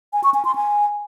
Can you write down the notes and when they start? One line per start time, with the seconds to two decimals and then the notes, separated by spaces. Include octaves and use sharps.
0.13 G#5
0.24 C#6
0.34 G#5
0.45 C6
0.55 G#5